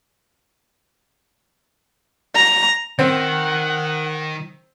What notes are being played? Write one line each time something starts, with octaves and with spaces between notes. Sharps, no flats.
A#5
D#3 C4 F#5